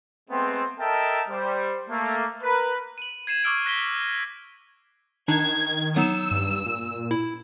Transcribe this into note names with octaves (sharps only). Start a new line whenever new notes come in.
G#3 A3 B3 C4
A4 A#4 D#5 E5 G5 A5
G3 C5
A3 A#3
A#4 B4
D#7 F#7
G#6 C7 D#7 E7
C#6 D6 E6 F6 D7
C#6 F#6 A#6 B6 D#7 G7
G7
D#3 D4 D#4 G#6
F#3 B3 D#4 E6
G2
A#2
E4